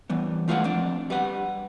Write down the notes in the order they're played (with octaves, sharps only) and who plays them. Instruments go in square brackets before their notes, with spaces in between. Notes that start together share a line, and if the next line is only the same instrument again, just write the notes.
[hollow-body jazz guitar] E3 G3 B3
G#3 A3 F4 B4 F5 F#5
F2 D4
G3 B4 F#5